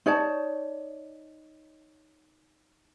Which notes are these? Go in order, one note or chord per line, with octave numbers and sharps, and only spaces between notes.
D#4 C#5 D5 A5